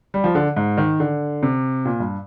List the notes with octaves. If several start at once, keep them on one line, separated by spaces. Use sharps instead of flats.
G3
F3
D3
G#2
D#3
D3
C3
A#2
G2